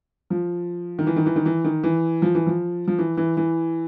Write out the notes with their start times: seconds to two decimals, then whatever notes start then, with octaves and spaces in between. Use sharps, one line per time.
0.30 F3
0.99 D#3
1.07 E3
1.16 D#3
1.26 E3
1.36 D#3
1.45 E3
1.64 D#3
1.84 E3
2.22 F3
2.35 E3
2.47 F3
2.88 F3
2.99 E3
3.17 E3
3.37 E3